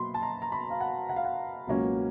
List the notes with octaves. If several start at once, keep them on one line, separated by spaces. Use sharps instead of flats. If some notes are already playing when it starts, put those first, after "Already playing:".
Already playing: B2 F#3 A#3 B5 C6
A5
A#5
A#5
B5
F5
F#5
F#5
F5
F#5
C#2 B2 F#3 A#3 C#4